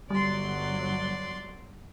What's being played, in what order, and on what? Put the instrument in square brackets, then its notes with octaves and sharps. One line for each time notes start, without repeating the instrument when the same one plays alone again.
[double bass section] G1 F#3 [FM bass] G3 [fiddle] D5 C6